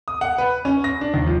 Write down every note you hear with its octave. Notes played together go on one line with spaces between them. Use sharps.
D#6
F#5
B4
C#4
A#6
D4
D#2
F3